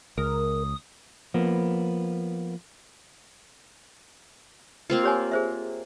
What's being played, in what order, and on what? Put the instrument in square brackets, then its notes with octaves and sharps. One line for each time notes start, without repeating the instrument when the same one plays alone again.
[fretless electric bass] C#2 [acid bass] A#4 [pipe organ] D#6
[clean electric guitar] F3 A#3 B3
[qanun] A#3 C4 F4
[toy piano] G4 C#5 G#5
G#4 C5 E5